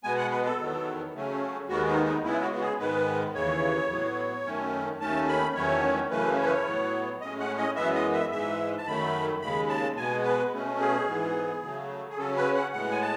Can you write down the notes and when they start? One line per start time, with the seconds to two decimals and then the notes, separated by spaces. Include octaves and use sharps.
0.03 B2 G#3 B3 G#5
0.17 F#5
0.31 B4
0.45 A4
0.59 E2 D#3 F#3 B3
1.14 C#3 F#3 A3 C#4
1.69 D#2 D#3 G#3 B3 F#4
1.87 D#4
2.05 D#4
2.24 C#3 G#3 B3 E4
2.42 F#4
2.54 F#4
2.61 G#4
2.79 G#2 D#3 G#3 B3 B4
3.34 D#2 C#3 E3 C#5
3.90 A2 F#3 B3
4.45 F#2 D#3 A3 C#4
5.00 D#2 D#3 A3 C#4 A5
5.28 B5
5.55 E2 D#3 F#3 A3 C#4 C#5
6.10 F#2 C#3 E3 A3 C#4 B4
6.38 C#5
6.45 B4
6.53 C#5
6.66 A2 F#3 B3
7.21 A2 G#3 C#4 D#5
7.40 F#5
7.58 D#5
7.76 F#2 E3 G#3 B3 E5
7.94 D#5
8.13 E5
8.31 G#2 E3 G#3 E5
8.78 A5
8.86 F#2 D#3 F#3 A3 B5
9.42 D#2 C#3 G#3 B5
9.69 A5
9.96 B2 G#3 B3 G#5
10.24 B4
10.52 B2 A3 C#4
10.80 G#4
11.07 G#2 E3 B3
11.62 C#3 F#3 A3
12.10 G#4
12.17 C#3 F#3 C#4 A4
12.37 B4
12.55 F#5
12.73 A2 G#3 B3 F#5
12.91 G#5
13.01 A5